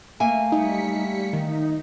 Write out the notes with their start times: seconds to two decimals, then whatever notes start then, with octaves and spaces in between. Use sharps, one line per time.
0.20 A3 A#3 E5 G#5
0.52 G3 D#4 B6 C#7
1.33 D#3 D#4